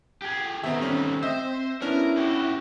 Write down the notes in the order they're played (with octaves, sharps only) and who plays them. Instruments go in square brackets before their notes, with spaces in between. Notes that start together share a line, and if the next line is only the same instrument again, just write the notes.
[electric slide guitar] G4 G#4
[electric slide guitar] D#3 A3 D#4 [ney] B3 [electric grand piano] C4 E5
[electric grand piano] G3 C#4 [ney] C4
[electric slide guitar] C5 [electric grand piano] D#5 E5 E6
[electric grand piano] B3 C#4 D4 [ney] E4 [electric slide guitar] A#4
[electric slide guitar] F#4 G4